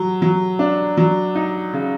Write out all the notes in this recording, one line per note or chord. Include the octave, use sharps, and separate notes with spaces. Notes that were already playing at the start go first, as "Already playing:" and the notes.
Already playing: F#3
F#3
D4
F#3
D#4
C#3